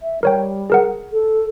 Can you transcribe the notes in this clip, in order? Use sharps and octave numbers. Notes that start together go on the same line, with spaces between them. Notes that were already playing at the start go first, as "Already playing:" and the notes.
E5
G3 A#4 C#5 G5
G#4 A#4 F#5
A4